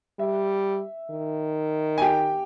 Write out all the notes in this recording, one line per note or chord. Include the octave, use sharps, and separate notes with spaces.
G3 E5
D#3
G#5
G4 G5